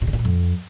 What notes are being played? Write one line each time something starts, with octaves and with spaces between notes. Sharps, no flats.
A#2
C#3
A#2
A2
F2